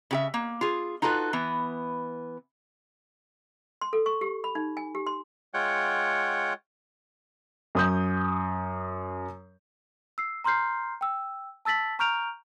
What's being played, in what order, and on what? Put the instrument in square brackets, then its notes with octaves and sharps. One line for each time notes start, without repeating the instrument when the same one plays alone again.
[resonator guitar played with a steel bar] C#3 G4 E5
A#3
F4 G#4
D#4 F4 F#4 A4 B4
E3 B3
[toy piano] C6
A4
C#6
G4
B5
D#4
G#5
G4
C6
[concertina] G#3 F4 C#5 F#5 G5
[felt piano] F#2 D#6 G6
[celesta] E6 C7
A#5 C6 F6 G6 C7
G5 E6
A5 E6 A6 B6 F#7
A#5 C#6 F6 G6 D7 F7